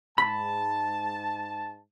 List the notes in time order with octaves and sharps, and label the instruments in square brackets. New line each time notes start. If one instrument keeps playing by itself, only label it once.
[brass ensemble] G#2 A5 [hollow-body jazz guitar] B5